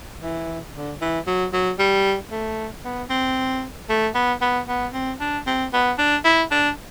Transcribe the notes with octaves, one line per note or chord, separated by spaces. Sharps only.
E3
D3
E3
F#3
F#3
G3
A3
B3
C4
A3
B3
B3
B3
C4
D4
C4
B3
D4
E4
D4